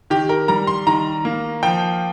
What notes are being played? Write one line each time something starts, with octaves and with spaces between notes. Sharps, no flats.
D#3 G4
A#4
G3 A#5
C6
D#3 A#5
A#3
F3 G5